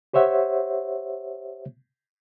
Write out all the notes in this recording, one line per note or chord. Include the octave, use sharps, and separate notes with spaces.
G4 C5 C#5 E5 F#5